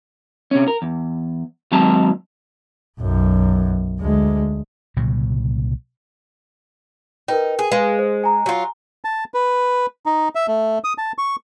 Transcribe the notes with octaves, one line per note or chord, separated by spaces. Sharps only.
C3 C#4
A#4
E2
D#2 F#3 G#3 C4 A5 A#5
B1 F#2
D2 G#3
C2 A#2 C#3 F#3
D#4 A#4 B4 G5
G#4
G#3 B4 F5 G#5
C5
G#5 A#5
F#3 F4
A5
B4
D#4
E5
A3
D#6
A5
C#6